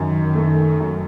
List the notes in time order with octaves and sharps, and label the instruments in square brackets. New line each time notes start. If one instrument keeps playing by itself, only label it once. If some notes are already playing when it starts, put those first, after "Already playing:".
Already playing: [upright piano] F#2 [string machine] D#3
[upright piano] A3
F#2